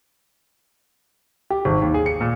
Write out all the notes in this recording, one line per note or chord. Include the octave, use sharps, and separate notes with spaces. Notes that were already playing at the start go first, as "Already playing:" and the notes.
G4
G#1
D#2
G#4
C#7
A#2